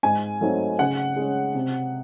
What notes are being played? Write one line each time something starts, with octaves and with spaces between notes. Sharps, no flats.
G#2 G#5
F#3 A3 C4 D#4
C#3 F#5
G#3 C#4
C3